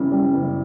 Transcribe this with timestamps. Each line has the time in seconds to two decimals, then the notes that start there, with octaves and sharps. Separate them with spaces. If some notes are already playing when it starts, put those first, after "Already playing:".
Already playing: F#1 F#2 E3 G3
0.12 G3
0.34 F#1